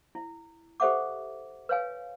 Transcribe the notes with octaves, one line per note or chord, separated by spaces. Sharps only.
E4
G4 A4 C5 E5 F#5 D6
B4 C#5 F5 G#5